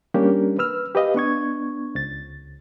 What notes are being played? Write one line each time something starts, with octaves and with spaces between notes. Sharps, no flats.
G3 A#3 C#4 D4 G4 A#4
B4 E6 F6
G4 B4 D#5 F5
B3 D4 C#6 G#6
C#2 A6